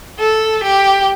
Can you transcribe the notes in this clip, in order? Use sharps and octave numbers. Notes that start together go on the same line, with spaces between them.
A4
G4